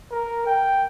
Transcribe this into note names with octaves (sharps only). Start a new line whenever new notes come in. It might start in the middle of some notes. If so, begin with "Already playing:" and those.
A#4
G5